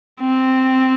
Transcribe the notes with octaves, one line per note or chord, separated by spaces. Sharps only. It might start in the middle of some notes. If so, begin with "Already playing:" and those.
C4